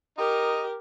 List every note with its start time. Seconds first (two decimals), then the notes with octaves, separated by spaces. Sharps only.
0.18 D#4 G4 A#4